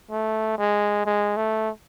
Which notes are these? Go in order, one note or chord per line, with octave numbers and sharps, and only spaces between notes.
A3
G#3
G#3
A3